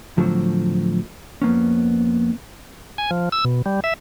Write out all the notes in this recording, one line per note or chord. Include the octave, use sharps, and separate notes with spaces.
A2 D3 F3 F#3 A3 C4
F2 A#3 B3 C#4
G#5
F3
E6
B2
G3
E5